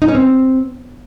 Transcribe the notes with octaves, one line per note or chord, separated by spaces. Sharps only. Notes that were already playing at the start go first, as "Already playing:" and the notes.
D#4
C#4
C4